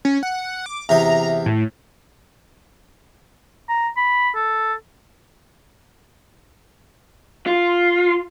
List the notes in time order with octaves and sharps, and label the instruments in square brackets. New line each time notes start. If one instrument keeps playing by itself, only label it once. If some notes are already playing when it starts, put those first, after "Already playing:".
[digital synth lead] C#4
F#5
D6
[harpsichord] E2 C3 D#5 [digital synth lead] A#5
[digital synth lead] A2
[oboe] A#5
B5
A4
[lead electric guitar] F4